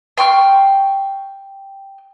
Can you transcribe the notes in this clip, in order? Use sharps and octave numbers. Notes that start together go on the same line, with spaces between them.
G5 C6 C#6 F6